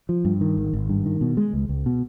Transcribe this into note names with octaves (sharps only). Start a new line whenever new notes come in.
F3
G2
D#3
G#1
G#1
G2
D#3
B2
G#3
C#2
C#2
B2